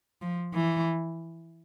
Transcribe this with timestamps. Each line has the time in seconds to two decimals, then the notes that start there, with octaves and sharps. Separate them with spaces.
0.21 F3
0.54 E3